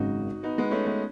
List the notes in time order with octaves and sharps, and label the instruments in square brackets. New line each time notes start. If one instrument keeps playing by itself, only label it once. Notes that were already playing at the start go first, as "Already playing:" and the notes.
Already playing: [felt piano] G#1 F#2 C#3 G#3 C#4 [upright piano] D#4 F#4
[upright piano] B3 D#4
G#3 B3
A3 C#4
G#3 B3